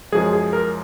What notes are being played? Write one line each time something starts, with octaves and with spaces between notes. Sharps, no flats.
F#2 F3 G#3 G#4
G#4
A#4